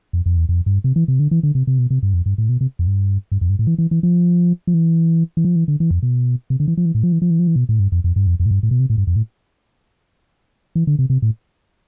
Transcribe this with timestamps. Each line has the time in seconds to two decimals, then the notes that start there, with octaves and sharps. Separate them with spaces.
0.13 F2
0.26 F2
0.37 E2
0.49 F2
0.66 G2
0.84 C3
0.96 E3
1.08 C3
1.19 D3
1.31 E3
1.43 D3
1.55 C3
1.67 C3
1.79 B2
1.90 C3
2.03 G2
2.14 F2
2.26 G2
2.38 A2
2.49 B2
2.61 C3
2.79 F2
2.87 G2
3.32 G2
3.41 F2
3.50 G2
3.59 A2
3.67 E3
3.78 E3
3.91 E3
4.03 F3
4.67 F3
4.74 E3
5.37 E3
5.45 F3
5.56 E3
5.68 D3
5.80 E3
5.91 F2
6.03 B2
6.50 C3
6.60 D3
6.68 E3
6.77 F3
6.86 E3
6.95 A2
7.03 F3
7.12 E3
7.22 F3
7.31 E3
7.39 F3
7.47 E3
7.56 B2
7.69 A2
7.79 G2
7.92 F2
8.04 F2
8.16 G2
8.27 F2
8.40 F2
8.46 A2
8.51 G2
8.63 A2
8.71 B2
8.80 C3
8.90 A2
8.98 G2
9.07 F2
9.16 A2
10.75 E3
10.87 D3
10.99 C3
11.10 C3
11.22 A2